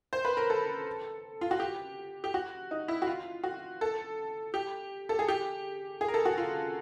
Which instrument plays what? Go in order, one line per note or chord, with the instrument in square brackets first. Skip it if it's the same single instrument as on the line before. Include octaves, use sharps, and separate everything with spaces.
[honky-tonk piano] C5
B4
A#4
A4
F4
F#4
G4
G4
F#4
D#4
E4
F#4
F4
F#4
A4
G4
A4
G#4
G4
G#4
A#4
A4
F#4
F4